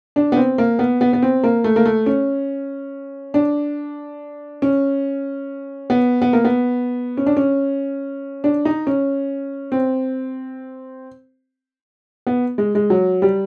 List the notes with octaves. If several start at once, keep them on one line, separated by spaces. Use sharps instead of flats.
D4
B3
C4
A#3
B3
B3
B3
C4
A#3
A3
A#3
A3
C#4
D4
C#4
B3
B3
A#3
B3
C#4
D4
C#4
D4
D#4
C#4
C4
B3
G#3
G#3
F#3
G3